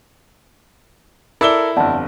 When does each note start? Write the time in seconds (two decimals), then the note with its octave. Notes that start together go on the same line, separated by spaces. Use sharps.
1.41 E4 A4 A#4 D5 E6 G7
1.76 G1 F2 D5 F#5 A5